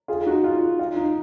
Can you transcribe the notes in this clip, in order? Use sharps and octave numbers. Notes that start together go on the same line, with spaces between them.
F4 G#4
D#4 F#4
F4
F4
D#4